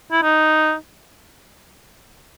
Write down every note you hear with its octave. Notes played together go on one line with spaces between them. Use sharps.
E4
D#4